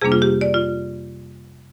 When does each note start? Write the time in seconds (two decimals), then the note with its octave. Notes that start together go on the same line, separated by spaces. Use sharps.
0.01 F2 C3 G3 A#3 D4 G#4
0.12 F4
0.22 G4
0.41 D5
0.54 F4